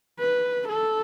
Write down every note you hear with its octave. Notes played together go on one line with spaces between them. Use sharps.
B4
A4